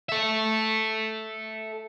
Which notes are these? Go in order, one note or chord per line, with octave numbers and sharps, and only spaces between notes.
A4 E5